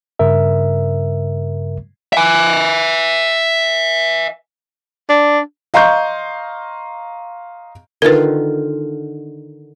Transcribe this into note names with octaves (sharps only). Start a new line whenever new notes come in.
G2 C#3 A#4 E5
E5 G#5
D4
D#5 F5 A#5 C6 C#6 G6
D3 D#3 F4 A#4 B4